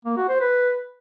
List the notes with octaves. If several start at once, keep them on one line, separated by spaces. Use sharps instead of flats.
A#3
F#4
C5
B4